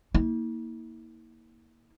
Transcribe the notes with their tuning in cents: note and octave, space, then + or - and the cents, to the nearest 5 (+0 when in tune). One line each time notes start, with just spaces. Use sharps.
A#3 +0 E4 -45